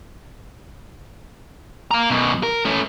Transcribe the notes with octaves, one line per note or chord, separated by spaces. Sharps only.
F5 A#5
F#2 B2
A#4
A3 C#4